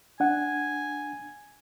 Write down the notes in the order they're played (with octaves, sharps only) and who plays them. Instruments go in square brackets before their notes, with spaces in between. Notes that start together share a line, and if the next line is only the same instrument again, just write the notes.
[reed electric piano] D4 F#5 [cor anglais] G#5